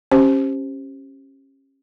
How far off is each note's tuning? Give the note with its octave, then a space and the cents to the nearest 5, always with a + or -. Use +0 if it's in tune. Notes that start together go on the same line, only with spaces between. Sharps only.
C#4 -25 G4 +0 C5 +0